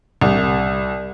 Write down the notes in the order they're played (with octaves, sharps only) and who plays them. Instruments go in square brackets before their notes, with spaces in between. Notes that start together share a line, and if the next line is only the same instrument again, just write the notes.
[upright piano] C2